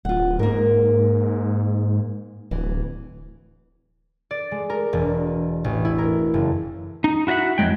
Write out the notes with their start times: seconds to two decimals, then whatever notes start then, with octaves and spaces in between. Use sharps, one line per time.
0.05 D1 F4 F#5
0.39 G#2 A#3 A#4
2.51 D1 E3
4.31 D5
4.51 G#3
4.70 A#4
4.93 E1
5.64 A1
5.85 E4
5.98 A#4
6.34 F#1
7.04 D#4
7.27 E4 F#4 D#5 E5 F#5
7.58 F2 G#2 F#3 G#3 G5